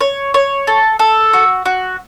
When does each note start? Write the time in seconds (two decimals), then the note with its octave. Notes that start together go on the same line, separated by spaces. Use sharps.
0.01 C#5
0.34 C#5
0.67 A4
0.99 A4
1.33 F#4
1.65 F#4